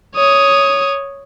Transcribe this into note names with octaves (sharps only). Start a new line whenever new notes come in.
C#5 D#6